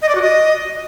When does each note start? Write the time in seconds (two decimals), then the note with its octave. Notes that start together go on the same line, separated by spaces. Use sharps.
0.02 D#5
0.09 D5
0.15 F#4
0.22 D#5